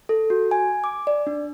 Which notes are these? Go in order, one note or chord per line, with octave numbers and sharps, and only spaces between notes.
A4
F#4
G#5
D6
D5
D4